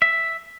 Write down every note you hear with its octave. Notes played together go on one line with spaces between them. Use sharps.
E5